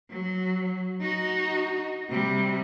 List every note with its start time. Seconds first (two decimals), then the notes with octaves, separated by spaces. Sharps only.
0.10 F#3
1.01 D#4 F#4
2.10 C3 G3